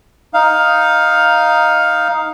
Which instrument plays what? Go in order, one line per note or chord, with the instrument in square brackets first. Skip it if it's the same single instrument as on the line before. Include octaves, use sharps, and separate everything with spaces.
[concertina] D#4 F5